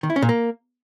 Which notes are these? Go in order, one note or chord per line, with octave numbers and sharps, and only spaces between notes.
D#3
E4
C#4
A#2
A#3